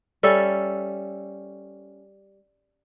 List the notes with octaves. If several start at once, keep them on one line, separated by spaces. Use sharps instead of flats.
G3 C#4 A4 E5